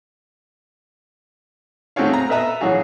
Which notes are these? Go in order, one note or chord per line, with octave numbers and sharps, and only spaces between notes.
A3 C4 F#4 G#4 C#5 F5
A#5
A4 B4 D#5 E5 A#5
A#1 A2 E3 F#3 F#4 G#4